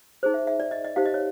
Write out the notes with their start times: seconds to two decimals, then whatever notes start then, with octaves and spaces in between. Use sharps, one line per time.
0.23 D#4 G#4 C5
0.34 E5
0.47 E5
0.60 D5
0.71 D#5
0.85 D#5
0.96 D#4 G4 C5 F5
1.06 D#5
1.14 C#5